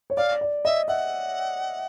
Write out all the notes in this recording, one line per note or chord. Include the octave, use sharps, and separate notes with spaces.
C#5
D5 F5
D5
D#5 E5
E5 F#5